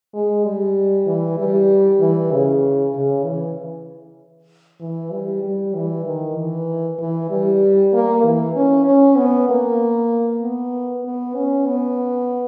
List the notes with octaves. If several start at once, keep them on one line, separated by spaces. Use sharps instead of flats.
G#3
G3
E3
G3
E3
C#3
C#3
E3
E3
G3
G3
E3
D#3
E3
E3
G3
A#3
E3
C#4
C#4
B3
A#3
B3
B3
C#4
B3